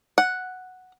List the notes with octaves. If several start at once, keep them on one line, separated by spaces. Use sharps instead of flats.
F#5